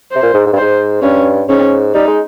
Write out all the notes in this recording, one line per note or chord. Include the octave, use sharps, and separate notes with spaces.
C3 C5
A#2
G#2
G#2
G2
G#2 C5
G2 C#4
G#2 C#4
G3 D#4
G#3